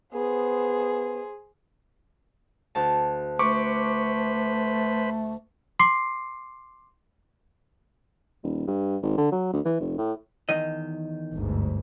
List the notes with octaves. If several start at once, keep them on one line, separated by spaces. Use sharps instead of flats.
B3 G#4 C5
D2 A5
A3 B4 C5 B5 C#6 D6
C6 D6 C7
D#1
G2
G#1
D3
F#3
D2
E3
F1
A2
E2 D#3 D#5
G1 D2 G#2